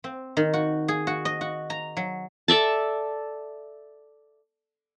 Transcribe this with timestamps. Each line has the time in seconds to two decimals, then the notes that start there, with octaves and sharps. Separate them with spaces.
0.04 C4
0.37 D#3
0.53 F#4
0.88 G#4
1.07 F#4
1.25 D#5
1.41 F#4
1.70 A#5
1.97 F#3
2.48 A4 D5 E5 A5